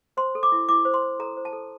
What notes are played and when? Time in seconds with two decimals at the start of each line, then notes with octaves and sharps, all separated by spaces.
0.17 C5 C6
0.35 A4
0.43 D6
0.52 E4
0.69 E4 D6
0.85 C5
0.94 C6
1.03 C5
1.20 A4 A#5
1.37 C5
1.45 A5
1.53 A4